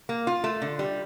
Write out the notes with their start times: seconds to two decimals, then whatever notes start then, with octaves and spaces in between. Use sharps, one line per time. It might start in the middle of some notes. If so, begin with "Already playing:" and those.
0.09 A#3
0.27 F4
0.44 A3
0.62 D3
0.79 G3